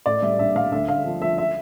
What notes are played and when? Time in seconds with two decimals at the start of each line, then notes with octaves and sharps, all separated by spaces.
0.06 A2 D5
0.22 G3 E5
0.39 A#1 E5
0.55 G3 F5
0.72 D2 E5
0.88 D2 F5
1.05 F3
1.22 F3 E5
1.38 E5